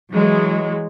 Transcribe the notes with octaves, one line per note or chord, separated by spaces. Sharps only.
E3 F#3 G#3